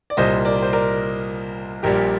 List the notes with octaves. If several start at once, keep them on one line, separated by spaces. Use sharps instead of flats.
D5
C2 A#2 G3 C5 D#5
A#4 D5
C5
A#4 D5
A#1 A#2 G3 G4 A#4